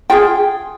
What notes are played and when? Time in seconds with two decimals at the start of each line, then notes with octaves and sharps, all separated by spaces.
0.10 F4 G#4 G5